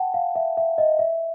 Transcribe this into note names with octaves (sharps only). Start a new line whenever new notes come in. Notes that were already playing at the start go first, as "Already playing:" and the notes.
Already playing: F#5 G5 A5
F5
E5
E5
D#5
E5